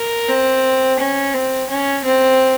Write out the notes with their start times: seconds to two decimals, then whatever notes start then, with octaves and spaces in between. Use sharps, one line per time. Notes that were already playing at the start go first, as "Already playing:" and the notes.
Already playing: A#4
0.29 C4
0.99 C#4
1.34 C4
1.69 C#4
2.04 C4